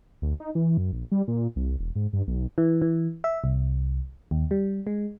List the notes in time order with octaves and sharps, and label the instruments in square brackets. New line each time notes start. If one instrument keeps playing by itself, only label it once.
[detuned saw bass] D2
D#4
E3
F#2
A#1
G3
A#2
C2
E1
G#2
G2
B1
[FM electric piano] E3
E3
E5
C2
D#2
G3
G#3